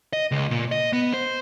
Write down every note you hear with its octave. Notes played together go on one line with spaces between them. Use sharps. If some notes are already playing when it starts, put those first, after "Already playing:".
D#5
C#2
A#2
D#5
B3
C5